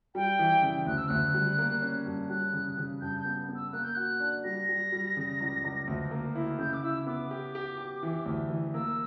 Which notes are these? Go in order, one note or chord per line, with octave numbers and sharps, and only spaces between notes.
G3 G5
E3
C#3
D2 F#6
E6
D2 F#6
G3
A#3
C#4
G2
G3 F#6
C#3
C#3
G2 G6
G6
B3
B3
E6
A#3 F#6
G6
F#4 F#6
D4
G3 A#6
G3
G3
C#3
C#2
C#2
D2
A#3
E4
C#3 G6
D6
E4 E6
B3 D6
G4
G4
G4
E3
D2
E3
A#3 E6